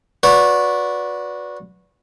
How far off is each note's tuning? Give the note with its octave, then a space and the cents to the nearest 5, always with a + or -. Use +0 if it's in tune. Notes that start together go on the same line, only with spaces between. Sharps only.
F#4 -20 B4 +0 D5 -20